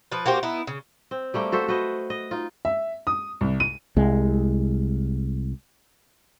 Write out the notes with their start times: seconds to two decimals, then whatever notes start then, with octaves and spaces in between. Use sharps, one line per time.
0.12 F3 B4
0.26 A#3 F#4 G4 C5
0.43 B3 D#4 E4
0.67 C#3
1.11 C4
1.34 G3 A3 A#3 G5
1.52 F#4 A4 C5 E5
1.68 F#4 B4 C5 D#5
2.10 D#5
2.31 D#4 F4
2.65 E5
3.07 D#6
3.41 C2
3.60 D#7
3.96 C2 G#3